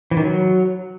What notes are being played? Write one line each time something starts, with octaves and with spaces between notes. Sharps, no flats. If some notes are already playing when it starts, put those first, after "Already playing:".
E3
D#3
F#3